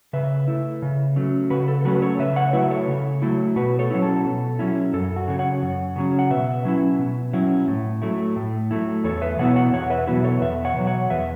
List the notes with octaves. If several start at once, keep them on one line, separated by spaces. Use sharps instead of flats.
C#3 B4 E5
A3 E4
C#3
F#3 A3 C#4
C#3 F#4 B4
A4
A4
F#3 A3 C#4 F#4 B4
A4 C#5
C#3 B4 E5
C#5 F#5
F#3 A3 E4 B4 E5
A4 C#5
C#3
F#3 A3 E4
B2 F#4 B4
A4 C#5
F#3 C#4 E4
A4
B2
F#3 C#4 E4
F#2 A4
F#4
C#3 F#3 C#4
C#5 F#5
F#2
C#3 F#3 C#4
F#5
B2 B4 E5
F#3 C#4 E4
B2
F#3 C#4 E4
A2
F#3 A3 E4
A2
F#3 A3 E4
E2 A4 C#5
B4 E5
B2 F#3 B3 E4 C#5 F#5
C#5 F#5
E2 C#5 F#5
B4 E5
B2 F#3 B3 E4 F#4 B4
A4 C#5
E2 B4 E5
C#5 F#5
B2 F#3
C#5 F#5
E2 B4 E5